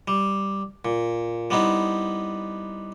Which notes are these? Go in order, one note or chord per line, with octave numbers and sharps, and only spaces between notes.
G3
A#2
G3 B3 C4 D#4 E4